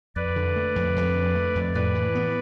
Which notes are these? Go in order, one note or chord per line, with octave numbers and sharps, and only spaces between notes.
F2 B4 D5
D3
A3
F2
F2
D3
A3
F2
A2 B4 D5
E3
B3